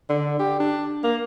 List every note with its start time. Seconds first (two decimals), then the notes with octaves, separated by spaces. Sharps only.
0.10 D3
0.39 G4
0.60 D4
1.04 A#3